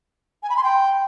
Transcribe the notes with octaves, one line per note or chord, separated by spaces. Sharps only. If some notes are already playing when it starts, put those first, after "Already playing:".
G#5
B5
C6
G5